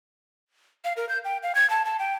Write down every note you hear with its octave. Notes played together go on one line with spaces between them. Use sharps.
F5
A#4
G6
G5
F5
G#6
A5
A5
G5